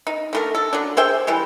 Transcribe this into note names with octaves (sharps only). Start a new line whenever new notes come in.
D#4
D3 A3 A#4
A4
D3 F#3 D4
G#4 C5 E5 G5
E3 G3 G#3